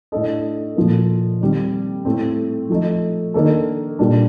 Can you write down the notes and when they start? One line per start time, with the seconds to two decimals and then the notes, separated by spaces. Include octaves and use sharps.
0.12 A2 A3 D4 A4 D#5
0.76 A#2 F3 A#3
1.41 D#3 G3 C4
2.05 A2 A3 C4
2.70 F3 A3 D#4
3.34 D#3 A#3 D4 A4
3.99 A#2 G3 D4